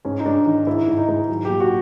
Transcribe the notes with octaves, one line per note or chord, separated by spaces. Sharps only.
G#2 C#4
D#4
G#2 D4
D#3 D#4
G#2 E4
G#2
D#4
G#2
F#3
A#2 G4
F#4